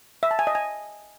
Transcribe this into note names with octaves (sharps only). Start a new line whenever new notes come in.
E5
A5
G#5
D#5
G#5